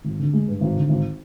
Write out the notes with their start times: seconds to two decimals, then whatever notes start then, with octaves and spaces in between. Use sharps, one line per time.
0.04 G#1
0.20 D3
0.33 G#3
0.48 G2
0.61 G#1
0.76 D3
0.89 G#1